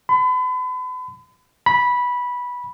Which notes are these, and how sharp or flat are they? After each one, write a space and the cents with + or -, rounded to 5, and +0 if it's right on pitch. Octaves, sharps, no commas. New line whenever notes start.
B5 +40
B5 -10